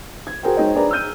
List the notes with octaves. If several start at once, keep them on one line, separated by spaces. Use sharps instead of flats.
G#6
F#4 G#4 A#4 C5 G5
G#3 D#4 C5 C#5 D#5 G5
D4 G#4 B4 D5 A#5
E6 F6 G6 D#7